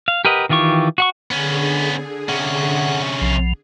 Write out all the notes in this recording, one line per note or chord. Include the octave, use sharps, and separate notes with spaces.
F5
G4 A#4 B4 D#5 F#5
D#3 E3 F4 G4 C#6
F#4 F#5 C#6
D3 B3 C#4 G#4
C3 C#4 F#5
B1 F3